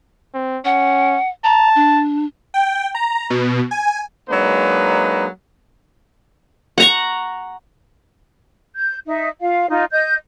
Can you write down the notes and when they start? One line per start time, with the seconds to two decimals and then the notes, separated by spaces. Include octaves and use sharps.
0.34 C4
0.65 C#4 F#5
1.44 A5 A#5
1.76 D4
2.54 G5
2.95 A#5
3.30 B2
3.71 G#5
4.30 F#3 G#3 A#3 D4 D#4 B4
6.78 F#5 A#5 C#6
8.75 G6
9.07 D#4 E5
9.40 F4 F5
9.69 D#4 F4
9.91 D#5 G6